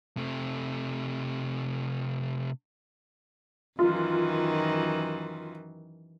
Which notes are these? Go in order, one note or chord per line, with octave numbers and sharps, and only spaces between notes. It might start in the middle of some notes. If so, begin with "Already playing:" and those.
C3 A3
F#2 D#3 E3 F4